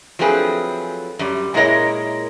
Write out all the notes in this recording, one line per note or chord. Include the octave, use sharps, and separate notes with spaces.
F3 F#3 A3 C4 G#4 B4
F#2 G3
A#2 G#3 E4 A#4 C#5 D#5